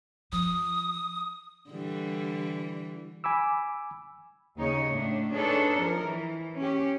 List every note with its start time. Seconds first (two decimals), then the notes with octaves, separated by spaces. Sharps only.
0.32 F3 D#6
1.70 D3 E3 G3
3.24 G#5 B5 D6 E6
4.56 D#2 C#3 D#4 C#5
4.89 A2 A3 D4
5.34 D4 D#4 G#4 A4 B4 C#5
5.76 F3 A#4
6.07 E3
6.57 C#4 G4